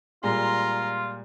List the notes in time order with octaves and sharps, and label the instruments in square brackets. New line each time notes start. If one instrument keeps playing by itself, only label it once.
[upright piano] A#2 G3 G#3 [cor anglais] F4 [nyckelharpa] A#5 C6